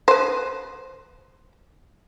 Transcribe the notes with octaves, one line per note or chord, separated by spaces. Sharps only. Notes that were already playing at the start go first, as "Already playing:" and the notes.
B4 C5